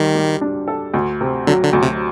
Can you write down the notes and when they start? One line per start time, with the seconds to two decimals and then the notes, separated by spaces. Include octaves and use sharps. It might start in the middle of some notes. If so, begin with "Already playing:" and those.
Already playing: D2 D#3 G3
0.15 G3
0.41 D4
0.68 A4
0.94 D2
1.21 C3
1.47 D3 F#3
1.65 D3
1.73 D2
1.82 C3